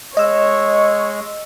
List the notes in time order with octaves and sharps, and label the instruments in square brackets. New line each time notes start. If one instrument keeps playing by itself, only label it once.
[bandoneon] G#3 [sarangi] C#5 [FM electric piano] D#5 E6